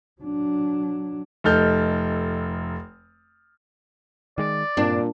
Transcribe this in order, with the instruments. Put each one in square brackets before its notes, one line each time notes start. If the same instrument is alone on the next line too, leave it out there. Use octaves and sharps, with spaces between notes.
[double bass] F#3 D4
[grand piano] F1 D#4 A4 F6 G6
[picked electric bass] D#3 G#3 [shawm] D5
[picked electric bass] G2 C4 [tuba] A#2 [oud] D4